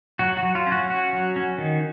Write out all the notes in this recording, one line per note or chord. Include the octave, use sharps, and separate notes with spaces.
F#3 F#4
F#4
F#3
F4
C#4
F#4
C#4 F#4
F#3
C#4
D#3